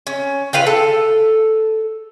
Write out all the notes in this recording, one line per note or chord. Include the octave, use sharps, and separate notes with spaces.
C#4
F4 B4 F5 G5
A4